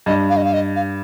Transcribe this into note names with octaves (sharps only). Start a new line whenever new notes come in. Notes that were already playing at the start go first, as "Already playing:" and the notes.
G2 D#5
F5
D#5
F5
D#5
F5